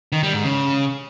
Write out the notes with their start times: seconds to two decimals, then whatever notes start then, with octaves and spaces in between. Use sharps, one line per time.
0.12 D#3
0.23 G3
0.34 G#2
0.44 C#3